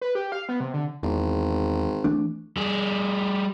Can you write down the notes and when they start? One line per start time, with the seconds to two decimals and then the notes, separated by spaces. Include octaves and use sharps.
0.02 B4
0.15 G4
0.32 F5
0.49 B3
0.60 C3
0.74 D3
1.03 G#1 E2
2.04 E3 A3 D4
2.57 G3 G#4